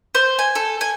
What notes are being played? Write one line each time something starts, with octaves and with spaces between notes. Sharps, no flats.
C5
G#5
A4
G#5